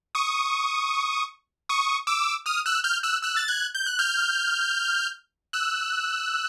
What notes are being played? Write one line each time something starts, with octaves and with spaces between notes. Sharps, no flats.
C#6 D#6
C#6 D#6
D6 E6
D#6 F6
E6 F#6
F6 G6
E6 F#6
E6 F#6
A6
F#6 G#6
G6
F#6
F6 G6
E6 F#6